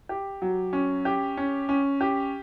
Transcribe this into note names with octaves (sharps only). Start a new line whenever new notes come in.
G4
F#3
C#4
G4
C#4
C#4
G4